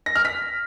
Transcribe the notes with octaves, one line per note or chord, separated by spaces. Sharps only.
A#6
F6
B6